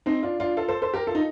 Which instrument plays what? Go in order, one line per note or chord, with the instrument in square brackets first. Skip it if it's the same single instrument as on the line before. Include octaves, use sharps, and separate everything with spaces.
[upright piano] C4 D#4
D4 F4
D4 F4
F4 A4
A4 C5
A4 C5
G4 A#4
F4 A4
D#4